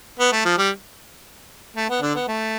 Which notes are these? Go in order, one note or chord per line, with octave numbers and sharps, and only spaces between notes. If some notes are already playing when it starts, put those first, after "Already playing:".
B3
A3
F3
G3
A3
B3
D3 D4
B3
A3